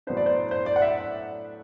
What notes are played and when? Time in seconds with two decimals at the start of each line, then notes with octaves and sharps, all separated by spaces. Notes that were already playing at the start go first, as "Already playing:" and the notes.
0.07 A2 F#3 B3 D4 C5
0.17 D5
0.26 C5
0.51 C5
0.66 D5
0.76 F#5
0.82 E5